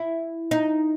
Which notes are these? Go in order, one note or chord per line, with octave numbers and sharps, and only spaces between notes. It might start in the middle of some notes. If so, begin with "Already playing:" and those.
Already playing: E4
D#4